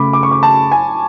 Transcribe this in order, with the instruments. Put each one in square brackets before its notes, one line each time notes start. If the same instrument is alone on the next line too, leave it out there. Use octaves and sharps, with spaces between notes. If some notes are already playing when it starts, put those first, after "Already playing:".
Already playing: [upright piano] C#3 A3 [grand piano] B5 D6
[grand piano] D6
C#6
D6
A5
G#5